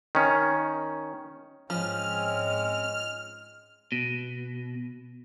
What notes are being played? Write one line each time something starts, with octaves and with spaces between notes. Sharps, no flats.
D#3 C#4
G#2 F3 G#3 C4 C#4 F6
B2